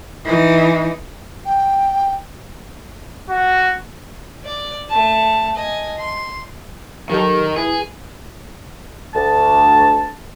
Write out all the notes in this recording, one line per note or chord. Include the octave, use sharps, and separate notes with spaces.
E3 D#4
G5
F#4
D5
A3 A5
D#5 G#5
C6
D#3 F#3 D#4 G4 A4
E4 G#4 B4
D2 A5